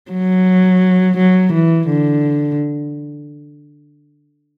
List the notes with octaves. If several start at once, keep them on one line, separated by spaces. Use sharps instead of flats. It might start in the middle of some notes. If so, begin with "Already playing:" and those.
F#3
F#3
E3
D3